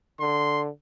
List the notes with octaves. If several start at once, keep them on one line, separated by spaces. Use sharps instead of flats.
D3 C6